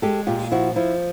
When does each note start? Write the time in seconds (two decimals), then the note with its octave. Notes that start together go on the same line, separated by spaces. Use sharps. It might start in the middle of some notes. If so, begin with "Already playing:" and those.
0.02 G#3 G4 A4
0.27 A#2 F4 G4
0.51 F3 E4 F#4
0.76 F3 E4